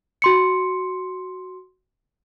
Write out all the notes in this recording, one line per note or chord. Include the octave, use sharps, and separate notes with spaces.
F#4 C6 C#7